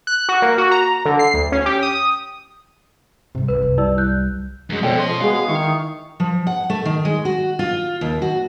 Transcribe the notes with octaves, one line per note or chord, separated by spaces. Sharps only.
F#6
F#4
A#3
F#4
A#5
D3
C7
D2
C#4
G4
D#6
D#6
G#2 C3 G3
B1 D#4 B4
C2 F#2
G3 E4 D5 E6
F#6 G6
F#2 F#3 G#3
B2 F3 C#4 A4 D5 G5
B2 C#5 D#5 C6
G#3 B3 F#4 G#4 F5
D#3 E4 C#6
F3
F#5
A3
D#3
G#3
F#4
F4
D#2
F#4